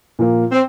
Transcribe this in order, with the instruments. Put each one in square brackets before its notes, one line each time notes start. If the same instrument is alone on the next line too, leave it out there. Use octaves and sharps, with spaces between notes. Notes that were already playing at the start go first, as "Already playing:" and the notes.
[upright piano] A#2 F3 A#3
[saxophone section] C4